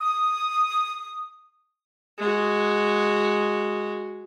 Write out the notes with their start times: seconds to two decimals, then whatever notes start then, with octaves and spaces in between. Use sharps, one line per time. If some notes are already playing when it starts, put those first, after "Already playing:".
0.01 D#6
2.18 G#3 F#4